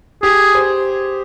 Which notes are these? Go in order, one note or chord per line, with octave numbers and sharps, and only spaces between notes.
G4 G#4
C5